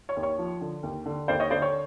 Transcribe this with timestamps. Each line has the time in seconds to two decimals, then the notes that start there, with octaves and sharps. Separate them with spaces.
0.09 C#5
0.16 D#2
0.23 C#5
0.38 F3
0.61 D3
0.83 D#2
1.05 D3
1.28 D#2 C5 D5
1.40 C#5 D#5
1.50 D3 C5 D5
1.62 C#5